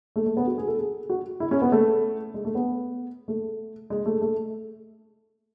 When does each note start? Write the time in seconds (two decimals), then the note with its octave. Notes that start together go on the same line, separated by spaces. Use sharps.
0.16 A3
0.26 A3
0.37 B3
0.47 F#4
0.58 G#4
0.68 A4
0.78 G#4
1.10 F#4
1.40 E4
1.51 C#4
1.62 B3
1.72 A3
2.34 G#3
2.45 A3
2.55 B3
3.28 A3
3.90 G#3
4.06 A3
4.22 A3